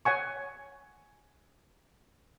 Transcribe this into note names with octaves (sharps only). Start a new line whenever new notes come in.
C#5 F#5 G#5 C#6